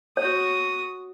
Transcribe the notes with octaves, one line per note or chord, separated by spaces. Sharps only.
F#4 C#5 D#6